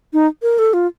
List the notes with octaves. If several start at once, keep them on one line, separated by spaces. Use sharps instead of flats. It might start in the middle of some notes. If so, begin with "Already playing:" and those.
D#4
A#4
A4
F4